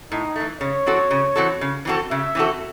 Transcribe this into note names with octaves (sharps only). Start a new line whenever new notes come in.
A2 D#4
E3 A3
C#3 C#5
E3 C4 F#4 A4
C#3
E3 C4 F#4 A4
C#3
E3 C4 F#4 A4
C#3 E5
E3 C4 F#4 A4